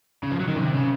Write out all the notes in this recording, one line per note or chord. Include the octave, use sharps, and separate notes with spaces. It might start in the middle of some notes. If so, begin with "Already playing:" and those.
C#3
F3
F#3
D#3
C3
C#3